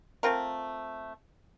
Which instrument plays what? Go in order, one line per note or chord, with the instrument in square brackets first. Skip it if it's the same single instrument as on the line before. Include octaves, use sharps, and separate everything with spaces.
[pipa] A3 C4 F4 A#4